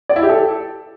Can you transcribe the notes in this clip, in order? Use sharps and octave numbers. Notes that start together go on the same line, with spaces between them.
D5
E4
G4
A4